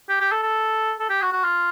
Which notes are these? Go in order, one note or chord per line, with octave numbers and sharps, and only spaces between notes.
G4
G4
A4
A4
A4
G4
F#4
F#4
F4